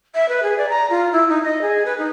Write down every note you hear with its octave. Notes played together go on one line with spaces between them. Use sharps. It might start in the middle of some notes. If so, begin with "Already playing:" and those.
E5
B4
G#4
D5
A#5
F4
E4
D#4
D#5
G#4
B4
D#4